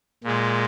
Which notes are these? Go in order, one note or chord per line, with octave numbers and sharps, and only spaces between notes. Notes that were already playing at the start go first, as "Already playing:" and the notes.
A#2 G#3